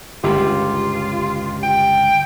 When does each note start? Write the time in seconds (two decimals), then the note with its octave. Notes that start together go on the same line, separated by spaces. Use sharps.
0.24 G1 C#2 F4 G4
1.63 G5